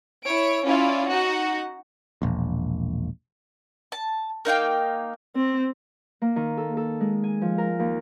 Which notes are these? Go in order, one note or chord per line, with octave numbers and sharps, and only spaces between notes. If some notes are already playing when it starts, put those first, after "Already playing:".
E4 C#5 D7
C#4 E4 F4 C#5 D5
D#4 F#4 F#5
E1 A#1
A5
A#3 D#4 F5 G5
C4
A#3
D#3
A4
A4
G#3
G#5
F3
A#4
D#2